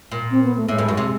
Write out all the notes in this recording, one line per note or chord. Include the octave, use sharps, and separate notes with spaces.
A#2
C4
B3
A3
A2 G#3
G2
F#2
C3